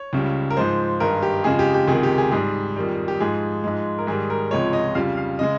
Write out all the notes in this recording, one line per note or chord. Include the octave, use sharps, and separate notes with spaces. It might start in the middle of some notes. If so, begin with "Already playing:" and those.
Already playing: C#5
C#2 C#3 G3
A#4
G#2 F3 G#3 C5
G2 D#3 G#3 A#4
G4
F2 C#3 G#3 G#4
G4
G4
C#2 C3 D#3 G#4
G4
G#4
G#2 G3 G#4
F2 D#3 G3
G4
G#2 F3 G#3 G#4
G#2 F3 G#3
A#4
G#2 D#3 G3 G#4
A#4
C#2 C3 F3 G#3 C#5
D#5
F2 C#3 G3 F5
F5
C#3 G#3 D#5